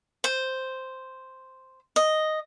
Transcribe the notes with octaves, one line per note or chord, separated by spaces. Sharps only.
C5
D#5